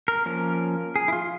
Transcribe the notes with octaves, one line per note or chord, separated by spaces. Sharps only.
A#4
F3 A#3 C#4 A#4
G#4
E4
F4